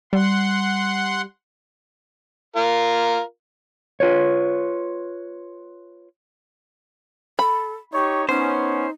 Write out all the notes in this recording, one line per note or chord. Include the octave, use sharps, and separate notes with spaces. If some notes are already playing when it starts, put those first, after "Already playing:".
G3 F#5 C6
F4 A#4
F4 B4 C#5
A4 B5
D#4 G4 C#5 C#6
B3 C#4 D#4 C5